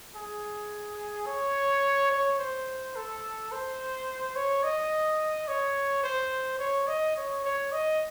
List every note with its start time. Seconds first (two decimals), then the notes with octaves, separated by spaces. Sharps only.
0.15 G#4
1.26 C#5
2.11 C#5
2.39 C5
2.96 A4
3.52 C5
4.36 C#5
4.63 D#5
5.48 C#5
6.03 C5
6.59 C#5
6.87 D#5
7.16 C#5
7.44 C#5
7.72 D#5